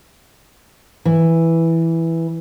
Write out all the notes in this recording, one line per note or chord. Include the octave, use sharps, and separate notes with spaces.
E3